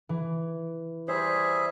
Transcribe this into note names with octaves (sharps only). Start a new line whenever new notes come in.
E3
G3 G#4 C5 E5